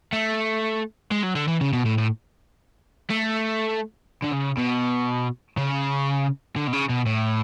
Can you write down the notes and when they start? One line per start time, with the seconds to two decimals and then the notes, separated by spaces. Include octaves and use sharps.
0.12 A3
1.12 G#3
1.23 F#3
1.36 D3
1.48 E3
1.61 C#3
1.73 B2
1.85 A2
1.98 A2
3.10 A3
4.24 D3
4.33 C#3
4.58 B2
5.57 C#3
6.56 D3
6.67 B2
6.73 C#3
6.89 B2
7.06 A2